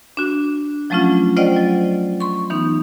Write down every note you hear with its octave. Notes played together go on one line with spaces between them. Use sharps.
D4 F#4
F3 F#3 A3 C#4 D4 F4
F4 C5 D5 D#5 F#5 G5
F#3
C6 C#6
E3 B3 D#4